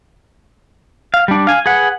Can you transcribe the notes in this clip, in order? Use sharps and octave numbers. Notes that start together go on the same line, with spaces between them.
F5
G3 D4
F5 G#5
G#4 B4 F#5